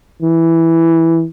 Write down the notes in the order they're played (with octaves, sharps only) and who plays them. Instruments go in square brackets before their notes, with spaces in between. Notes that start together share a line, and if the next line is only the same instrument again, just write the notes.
[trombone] E3